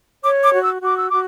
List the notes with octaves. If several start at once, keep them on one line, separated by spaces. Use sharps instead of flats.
C#5 D6
D6
F#4
E6
F#4 D6
E6
F#4 D6